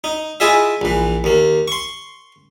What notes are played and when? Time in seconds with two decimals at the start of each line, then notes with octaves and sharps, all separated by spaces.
0.04 D#4
0.40 E4 F4 G#4 D#5 E5
0.81 A#1 E3
1.24 D#2 A#3
1.68 C6 C#6